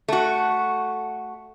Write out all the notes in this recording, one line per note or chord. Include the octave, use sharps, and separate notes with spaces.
A3 F#4